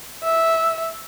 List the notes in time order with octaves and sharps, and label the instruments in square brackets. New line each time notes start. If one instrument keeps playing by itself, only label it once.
[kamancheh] E5